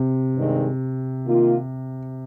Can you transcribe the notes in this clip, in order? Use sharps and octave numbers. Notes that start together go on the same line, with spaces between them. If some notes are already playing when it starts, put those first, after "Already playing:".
Already playing: C3
G2 D#3 G#3 C4
D#3 A#3 F4